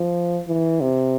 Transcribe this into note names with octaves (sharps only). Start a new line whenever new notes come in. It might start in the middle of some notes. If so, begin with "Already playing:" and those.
Already playing: F3
E3
C3